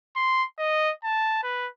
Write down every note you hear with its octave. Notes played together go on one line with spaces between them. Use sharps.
C6
D#5
A5
B4